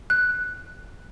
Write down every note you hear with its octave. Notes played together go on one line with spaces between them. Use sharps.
F#6